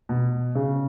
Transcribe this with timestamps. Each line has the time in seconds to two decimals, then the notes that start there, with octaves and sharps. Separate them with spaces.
0.09 B2
0.55 C#3